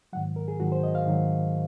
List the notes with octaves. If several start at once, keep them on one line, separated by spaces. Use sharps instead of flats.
G#2 D#3 F#3 F#5
A#4
G#4
G#2 D#3 F#3 F#4
C5
D#5
F5
G#2 D#3 F#3